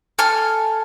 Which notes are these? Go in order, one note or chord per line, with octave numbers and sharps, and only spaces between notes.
A4 G#5 F6